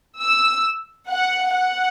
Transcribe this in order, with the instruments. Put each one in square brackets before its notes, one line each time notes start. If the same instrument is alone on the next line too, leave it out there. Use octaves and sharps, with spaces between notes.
[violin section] E6
F#5
F#5